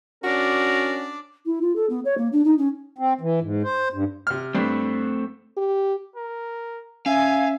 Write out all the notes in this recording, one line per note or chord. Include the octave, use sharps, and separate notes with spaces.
C#4 D4 F#4 A#4 D5
E4
F4
A4
B3
C#5
A#3
D4
D#4
C#4
C4
E3
G#2
C5
G2
C3 F6
G2 A3 C4
G4
A#4
C#4 E5 F5 G#5